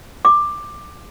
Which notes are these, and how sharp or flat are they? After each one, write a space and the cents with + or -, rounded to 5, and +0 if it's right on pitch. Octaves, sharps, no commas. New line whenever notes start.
D6 +15